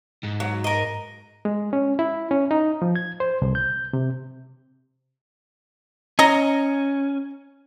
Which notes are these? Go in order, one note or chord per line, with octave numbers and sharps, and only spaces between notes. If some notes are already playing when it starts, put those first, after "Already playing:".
G#2
F#3
A#4 D#5
G#3
C#4
E4
C#4
D#4
F3
G#6
C5
C2
G6
C3
C#4 D#5 A#5